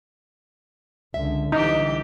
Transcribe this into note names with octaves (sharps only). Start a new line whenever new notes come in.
C#2 D3 E5
C2 D3 E3 D#4 G4